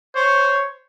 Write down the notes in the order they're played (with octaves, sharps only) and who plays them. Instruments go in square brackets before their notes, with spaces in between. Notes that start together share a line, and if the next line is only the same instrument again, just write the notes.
[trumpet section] C5 C#5